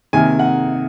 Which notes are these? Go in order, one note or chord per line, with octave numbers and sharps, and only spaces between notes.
C3 D#3 A#3 G#5
F#5